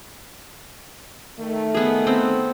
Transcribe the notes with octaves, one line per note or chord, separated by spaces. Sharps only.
D#3 A3
B3 G#4
B3 C4